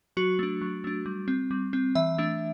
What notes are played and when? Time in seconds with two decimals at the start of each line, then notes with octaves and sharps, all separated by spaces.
0.17 F#3 F#4
0.39 A3 D4
0.61 F#3
0.84 A3 D4
1.06 G3
1.28 C4
1.51 G3
1.73 C4
1.95 E3 E5
2.18 A3 D4